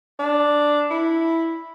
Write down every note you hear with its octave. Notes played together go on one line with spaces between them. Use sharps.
D4
E4